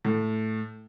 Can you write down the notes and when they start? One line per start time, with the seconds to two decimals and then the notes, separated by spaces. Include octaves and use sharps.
0.05 A2